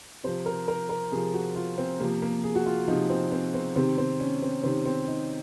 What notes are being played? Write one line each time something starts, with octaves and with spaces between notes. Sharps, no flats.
C3 F3 C5
A#4
A#4
A#4
C3 F3 G#4
F#4
F4
C4
C3 F3 A#3
A#3
G#4
F#4
F4
C3 F3 D#4
C4
C4
C4
C3 D#3 C4
C4
C#4
C4
C3 D#3 C4
C4
D#4